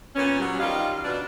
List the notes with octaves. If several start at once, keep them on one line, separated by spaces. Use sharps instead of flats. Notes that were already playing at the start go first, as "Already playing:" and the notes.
A#2 B3 C#4
F#3 G3
D#3 G3 F4 D#5 F5
B2 D4